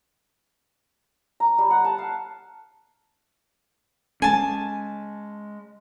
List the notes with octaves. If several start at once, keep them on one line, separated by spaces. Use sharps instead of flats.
A#5
G3
F#5
A5
F5
G#3 C#4 G#5 A5